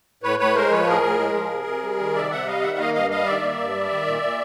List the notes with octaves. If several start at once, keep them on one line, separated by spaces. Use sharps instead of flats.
A2 B4 C#5
A2 B4 C#5
G#3 A#4 C5
F3 B4 C#5
A2 G#4 A#4
A2
G#3
F3
C3
C3
G3
D#3
C3 D5 E5
C3 E5 F#5
G3 D#5 F5
D#3 E5 F#5
A#3 D#5 F5
G2 D#5 F5
G3 D#5 F5
D#3 D5 E5
A#3
G2
G3
D#3
A#2
A#2